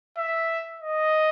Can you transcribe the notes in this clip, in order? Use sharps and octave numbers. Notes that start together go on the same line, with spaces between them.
E5
D#5